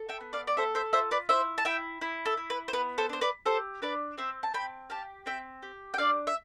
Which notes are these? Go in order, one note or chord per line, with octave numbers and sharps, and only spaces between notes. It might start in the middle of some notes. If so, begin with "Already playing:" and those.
Already playing: A4
E5 G5
B3
D5 F5
D5
A4 C5 E5
C5 E5
F4 C5 E5
B4 D5
E4 C5 E5
A5
E4 E5 G5
E4
A4
E4
B4
C5
B3 B4
A4 C5
D4 C5
B4 D5
G4 A4 C5
D4 B4 D5
C4 C5 E5
A5
C4 G5 B5
G4 F5 A5
C4 E5 G5
G4
G5
D4 D5 F5
E5